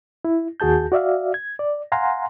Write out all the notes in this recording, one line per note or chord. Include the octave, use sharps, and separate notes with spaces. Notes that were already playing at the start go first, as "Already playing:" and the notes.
E4
D#2 F#4 G#4 A5 G6
F#4 D5 E5 F5
G#6
D5
F5 F#5 G#5 A#5 C6